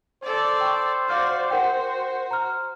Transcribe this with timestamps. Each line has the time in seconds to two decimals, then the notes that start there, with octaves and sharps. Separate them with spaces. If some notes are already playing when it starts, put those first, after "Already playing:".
0.23 A4 C5 D5
0.61 G5 C#6
1.08 F#4 D5 F5 F6 G6
1.50 F#4 A#4 F#5 G5
2.31 A#5 F6